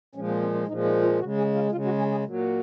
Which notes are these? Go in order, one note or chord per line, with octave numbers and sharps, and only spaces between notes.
A#2 F3 G#3 C#4
C4
C4
C#4
A#2 F3 G#3 D#4
D#4
F4
C#3 G#3 F#4
G#4
F4
C#3 G#3 F4
F#4
G#4
G#4
A#2 F#3